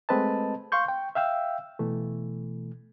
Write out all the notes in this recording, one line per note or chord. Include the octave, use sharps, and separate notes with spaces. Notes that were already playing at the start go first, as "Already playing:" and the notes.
G#3 A3 C4 B4 D#5 A5
F5 C6 C#6 G6
G5
E5 F5 G5 E6
B2 E3 A3